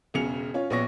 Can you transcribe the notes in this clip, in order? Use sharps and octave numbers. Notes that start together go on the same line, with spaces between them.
E1 E2 C#3 C#7 F7
C#4 F4 C#5
A#1 B3 C#5 C#6 A#6